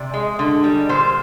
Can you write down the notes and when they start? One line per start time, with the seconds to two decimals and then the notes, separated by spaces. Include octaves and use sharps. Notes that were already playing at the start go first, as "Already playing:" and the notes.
Already playing: C3 D5
0.14 G#3
0.39 D3
0.64 G3
0.89 A#2 C5